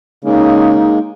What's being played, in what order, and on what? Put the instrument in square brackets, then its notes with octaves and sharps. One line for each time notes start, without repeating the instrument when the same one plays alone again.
[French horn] C#3 [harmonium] G#3 A#3 [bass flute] D#4